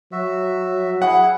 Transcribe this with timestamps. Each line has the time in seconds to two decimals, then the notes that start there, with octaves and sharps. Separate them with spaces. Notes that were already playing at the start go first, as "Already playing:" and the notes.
0.12 F#3 F#4 E5
1.02 E4 G#4 F#5